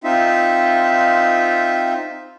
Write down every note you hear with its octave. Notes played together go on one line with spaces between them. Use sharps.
C4 D#4 F4 E5